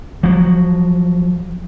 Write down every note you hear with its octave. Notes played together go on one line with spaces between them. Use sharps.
F3 F#3